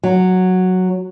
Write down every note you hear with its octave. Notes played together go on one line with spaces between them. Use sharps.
F#3